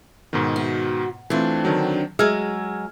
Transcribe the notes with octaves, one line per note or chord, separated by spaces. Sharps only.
G#2 B2 D#3
F#4
E3 A3 C4 D4 F4
D3 D#3 F#3
F#3 G#3 E6 F6 G#6